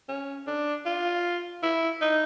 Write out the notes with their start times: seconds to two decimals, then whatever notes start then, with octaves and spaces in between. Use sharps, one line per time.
0.09 C#4
0.47 D4
0.86 F4
1.63 E4
2.01 D#4